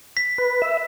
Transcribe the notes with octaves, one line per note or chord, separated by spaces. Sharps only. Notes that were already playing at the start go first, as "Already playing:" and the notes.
B6
B4
E5